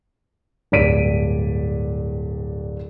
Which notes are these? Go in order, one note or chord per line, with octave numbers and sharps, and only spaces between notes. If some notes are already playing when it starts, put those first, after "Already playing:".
D1 G2 D5 B6 D7 D#7